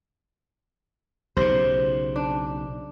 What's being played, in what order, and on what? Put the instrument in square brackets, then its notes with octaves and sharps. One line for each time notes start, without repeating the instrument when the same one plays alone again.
[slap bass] B1 C#3 [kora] G4 C5
[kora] D4